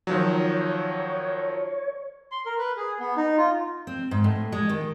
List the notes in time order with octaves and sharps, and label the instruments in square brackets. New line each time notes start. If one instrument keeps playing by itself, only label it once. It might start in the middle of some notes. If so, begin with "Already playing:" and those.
[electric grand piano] D#3 F3 F#3 [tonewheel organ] C#5
[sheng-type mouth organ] C6
A#4
B4
G#4
B3
D#4
F4
[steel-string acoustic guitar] C4
G#2
A2
G#3
D#3